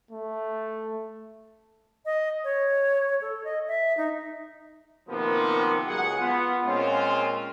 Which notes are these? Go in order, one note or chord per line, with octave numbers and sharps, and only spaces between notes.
A3
D#5
C#5
A4
D#5
E5
D#4
C3 D#3 F3 A#3 B3
C#2 F#3 G#4 F#5
B3 F4
A#2 G#3 C4 C#4 F4